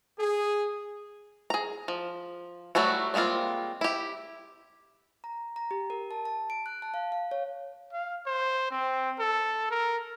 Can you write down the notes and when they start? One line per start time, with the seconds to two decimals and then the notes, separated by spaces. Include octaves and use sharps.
0.19 G#4
1.50 G#4 A#5
1.88 F3
2.75 F#3 G3 A3 E4 F#4
3.14 G3 G#3 A#3 C4 F4
3.81 E4 G4
5.24 A#5
5.56 A#5
5.71 G4
5.90 A#4
6.11 A5
6.25 A5
6.50 D7
6.66 F#6
6.82 A5
6.94 F5
7.12 F5
7.31 C#5
7.93 F5
8.26 C5
8.70 C4
9.20 A4
9.71 A#4